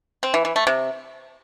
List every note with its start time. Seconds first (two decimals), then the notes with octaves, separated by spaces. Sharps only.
0.23 C4
0.34 E3
0.45 E3
0.56 A3
0.67 C3